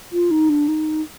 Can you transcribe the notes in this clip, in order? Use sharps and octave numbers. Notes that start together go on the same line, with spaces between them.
F4
D#4
D4
D#4